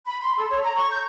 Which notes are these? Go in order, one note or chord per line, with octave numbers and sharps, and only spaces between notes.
B5
C6
A4
C#5
A#5
C#6
G6